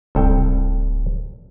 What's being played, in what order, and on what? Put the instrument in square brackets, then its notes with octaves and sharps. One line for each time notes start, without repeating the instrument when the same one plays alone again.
[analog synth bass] D1 [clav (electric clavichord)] C2 A4 G5